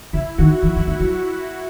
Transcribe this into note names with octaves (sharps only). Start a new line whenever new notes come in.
C#3 E4
D#3 F#4
E3 E4
E3
D#3
F#3